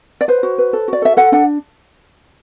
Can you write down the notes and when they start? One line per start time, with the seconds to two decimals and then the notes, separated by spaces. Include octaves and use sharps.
0.21 D5
0.28 B4 C5
0.43 F#4
0.58 B4
0.73 A4
0.88 F#4 D5
1.02 A4 E5
1.17 A4 F#5
1.32 D4 F#5